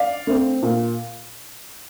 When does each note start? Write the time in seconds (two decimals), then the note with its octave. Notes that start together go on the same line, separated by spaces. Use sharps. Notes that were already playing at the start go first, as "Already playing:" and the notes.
Already playing: D5 F5
0.27 A3 C4
0.62 A#2